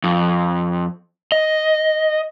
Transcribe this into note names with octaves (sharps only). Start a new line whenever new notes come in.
F2
D#5